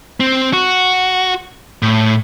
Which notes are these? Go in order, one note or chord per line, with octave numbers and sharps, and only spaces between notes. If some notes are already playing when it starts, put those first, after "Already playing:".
C4
F#4
A2